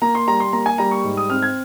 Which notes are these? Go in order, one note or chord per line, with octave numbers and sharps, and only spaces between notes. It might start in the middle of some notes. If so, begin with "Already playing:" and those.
A#3 A#5
C6
G3 A#5
C6
A#3 A#5
G#5
G3 A#5
C#6
G#2
D#6
C4 F6
G#6